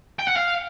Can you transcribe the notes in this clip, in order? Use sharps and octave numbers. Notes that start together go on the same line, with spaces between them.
G5
F#5
F5